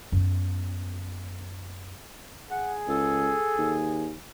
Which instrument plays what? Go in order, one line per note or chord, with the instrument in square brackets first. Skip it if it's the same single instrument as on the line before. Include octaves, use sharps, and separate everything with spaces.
[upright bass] F#2 B3
[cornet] G#4 [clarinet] F#5
[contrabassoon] C#2 [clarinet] A4
[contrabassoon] D#2